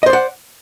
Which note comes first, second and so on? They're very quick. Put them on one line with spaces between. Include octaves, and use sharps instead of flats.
D#5 C5 D5 F#5